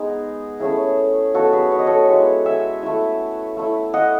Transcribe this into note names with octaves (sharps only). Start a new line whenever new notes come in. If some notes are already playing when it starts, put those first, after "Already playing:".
Already playing: G#3 B3 D#4 G#4
A3 C#4 E4 G#4
F#3 B3 D#4 F#4 A4
G#4 B4
C#5
D#5
A4 C#5
G#3 B3 E4
E5 G#5
A3 E4
A3 E4
D#5 F#5